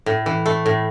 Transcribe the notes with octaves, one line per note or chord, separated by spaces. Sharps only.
A2
E3
A3
A2